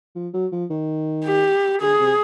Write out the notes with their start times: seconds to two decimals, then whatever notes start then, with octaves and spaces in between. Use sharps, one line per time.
0.15 F3
0.34 F#3
0.52 F3
0.70 D#3
1.26 G4
1.81 D3 G#4
2.00 C3